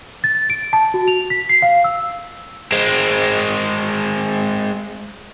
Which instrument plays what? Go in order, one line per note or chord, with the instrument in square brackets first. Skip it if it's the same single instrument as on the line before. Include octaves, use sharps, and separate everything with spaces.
[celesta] A6
D7
A5
F#4
F7
B6
C7
F5
E6
[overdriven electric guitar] G#3 C4